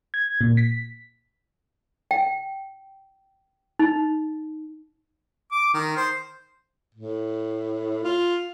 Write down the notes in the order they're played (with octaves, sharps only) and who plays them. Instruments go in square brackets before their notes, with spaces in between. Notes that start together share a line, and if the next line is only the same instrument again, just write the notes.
[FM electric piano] G#6
A#2
B6
[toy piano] G5
D#4
[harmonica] D6
D#3
C5
[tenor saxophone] A2
F4